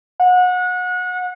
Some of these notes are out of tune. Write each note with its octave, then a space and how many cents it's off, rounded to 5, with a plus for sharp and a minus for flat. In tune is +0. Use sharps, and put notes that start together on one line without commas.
F#5 -30